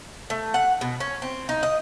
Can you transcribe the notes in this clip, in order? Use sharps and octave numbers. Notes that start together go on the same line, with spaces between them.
A3
F#5
B2
C#4
C4
D#4
D#5